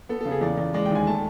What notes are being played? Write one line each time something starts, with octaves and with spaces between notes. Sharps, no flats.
B3 A4
A4
C#3
G#4
E2 D5
E2
G#3 D5
G5
D#2 G#5
A3 A5